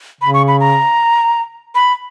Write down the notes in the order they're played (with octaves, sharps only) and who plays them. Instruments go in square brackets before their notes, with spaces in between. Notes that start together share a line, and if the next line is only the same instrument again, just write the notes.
[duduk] C#3 [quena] B5
[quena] C#6
B5
A#5
B5